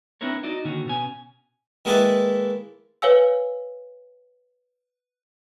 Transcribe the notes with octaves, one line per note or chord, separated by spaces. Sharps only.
C4 D4 E4 A#4 C#5
D#4 F#4 D5 D#5
A#2 D3 D#3 C#4 F#4
B2 C#4 G#5
D#3 G#3 A#3 E4 A4 B4
B4 C#5 F5 G#5 E6